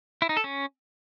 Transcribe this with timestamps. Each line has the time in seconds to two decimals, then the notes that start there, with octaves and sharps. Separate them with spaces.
0.22 E4
0.29 D#4
0.37 A4
0.44 C#4